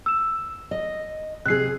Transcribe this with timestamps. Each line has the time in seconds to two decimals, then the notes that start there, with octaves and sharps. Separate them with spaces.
0.06 E6 E7
0.71 D#5
1.46 C3 G#4 F#6 C7